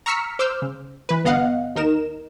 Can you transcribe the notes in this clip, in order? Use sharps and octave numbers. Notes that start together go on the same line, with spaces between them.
A#5 C#6 E6 F6 B6 C#7
C5 D6 E6 F6 G6
C#3
E3 B4
G1 B3 D#5 F5 F#5
D#2 D#4 A#4 E7